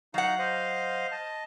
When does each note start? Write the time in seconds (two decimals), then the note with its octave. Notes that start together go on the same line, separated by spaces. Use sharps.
0.14 F#3 D#4 F5 F#5 A#5
0.39 C5 D#5 F5
1.12 D#5 A5